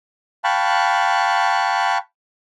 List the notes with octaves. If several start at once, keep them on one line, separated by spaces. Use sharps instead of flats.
F5 G5 A5 B5 C#6 F#6